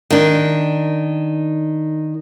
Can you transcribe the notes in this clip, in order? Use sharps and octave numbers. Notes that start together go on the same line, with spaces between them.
D#3 D4